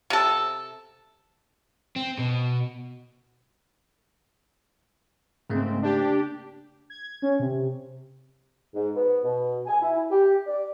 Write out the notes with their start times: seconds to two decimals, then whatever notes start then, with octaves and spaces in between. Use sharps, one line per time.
0.10 C3 A4
1.96 C4
2.18 B2
5.50 G#2 C#3 A3 A#3 C4
5.82 D4 G4
6.90 G#6
7.22 C#4
7.39 C3
8.73 G#2
8.95 B3
9.23 B2
9.66 G#5
9.81 E4
10.09 G4
10.46 D5